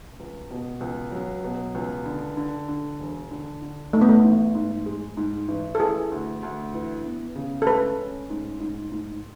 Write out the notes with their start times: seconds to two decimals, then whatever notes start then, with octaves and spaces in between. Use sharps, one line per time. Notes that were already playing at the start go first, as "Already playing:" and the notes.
0.20 C#2
0.51 B2
0.81 C#2
1.12 F#3
1.44 B2
1.75 C#2
2.06 D3
2.37 D3
2.68 D3
3.00 E1
3.31 D3
3.62 D3
3.93 G#2 A3
4.01 B3
4.09 A3
4.24 A1
4.55 G#2
4.86 G#3
5.17 G#2
5.48 A1
5.75 A4
5.80 E3 G#4
6.12 D2
6.43 D2
6.74 E3
7.05 B3
7.36 C#3
7.62 A4
7.67 G#3 B4
7.98 C#4
8.30 G#2
8.60 G#2
8.92 G#2